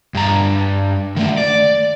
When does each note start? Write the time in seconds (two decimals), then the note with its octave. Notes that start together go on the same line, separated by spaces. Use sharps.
0.15 G2 A#5
1.16 D#3 A3
1.38 D5